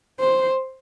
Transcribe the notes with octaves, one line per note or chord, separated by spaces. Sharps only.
C5